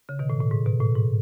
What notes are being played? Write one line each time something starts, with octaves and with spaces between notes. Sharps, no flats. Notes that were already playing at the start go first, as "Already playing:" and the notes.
C#3
B2 D#3
A2
A2
G#2
B2
A2
G#2